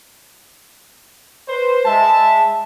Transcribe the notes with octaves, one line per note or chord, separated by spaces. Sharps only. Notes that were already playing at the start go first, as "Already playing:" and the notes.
B4 C5
G#3 E5 A5